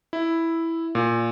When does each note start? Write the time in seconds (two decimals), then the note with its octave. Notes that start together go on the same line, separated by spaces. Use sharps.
0.13 E4
0.95 A#2